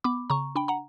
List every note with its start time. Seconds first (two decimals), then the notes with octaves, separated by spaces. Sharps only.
0.04 B3 B5 D6
0.30 C#3 A#5 C#6
0.55 D4 G5 B5
0.68 F#5 A#5